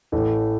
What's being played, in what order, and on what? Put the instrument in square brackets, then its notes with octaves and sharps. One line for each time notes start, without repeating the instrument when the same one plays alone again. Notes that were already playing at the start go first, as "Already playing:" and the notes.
[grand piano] A1 A2 E3 A3